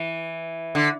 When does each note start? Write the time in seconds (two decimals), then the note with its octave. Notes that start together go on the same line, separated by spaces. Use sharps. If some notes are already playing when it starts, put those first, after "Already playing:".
Already playing: E3
0.75 D3